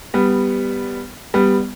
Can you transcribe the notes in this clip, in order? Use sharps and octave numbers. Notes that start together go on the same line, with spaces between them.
G3 B3
G3 B3